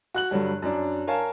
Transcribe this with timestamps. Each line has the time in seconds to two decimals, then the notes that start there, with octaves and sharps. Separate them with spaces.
0.14 F#4 F#6 F#7
0.31 G2 D3 F#3 G3
0.62 F#2 D4
1.07 A#4 C#5 F5 G#5 A5